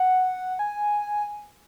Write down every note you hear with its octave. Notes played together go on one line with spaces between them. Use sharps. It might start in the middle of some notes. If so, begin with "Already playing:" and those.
Already playing: F#5
G#5